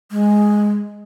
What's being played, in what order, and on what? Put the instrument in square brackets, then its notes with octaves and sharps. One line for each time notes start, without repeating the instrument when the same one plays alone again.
[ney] G#3